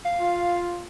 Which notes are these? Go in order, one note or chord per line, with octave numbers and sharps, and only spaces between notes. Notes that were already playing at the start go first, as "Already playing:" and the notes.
F5
F4